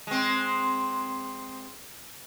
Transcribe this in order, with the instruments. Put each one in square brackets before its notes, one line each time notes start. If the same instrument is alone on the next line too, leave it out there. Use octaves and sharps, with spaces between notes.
[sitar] G#3 C4